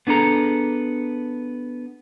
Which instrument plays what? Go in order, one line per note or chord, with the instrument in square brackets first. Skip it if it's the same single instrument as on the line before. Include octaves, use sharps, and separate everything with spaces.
[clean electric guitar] B3 D4 G#4 A4 A#5